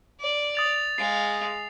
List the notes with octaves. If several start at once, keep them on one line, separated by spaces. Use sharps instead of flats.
D5
D#6 A6 F7
G#3 F5 C7